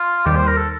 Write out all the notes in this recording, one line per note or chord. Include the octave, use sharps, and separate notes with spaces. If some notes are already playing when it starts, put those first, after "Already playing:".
Already playing: F4
D#2 D#3 G3 G4
C5
A#4
A4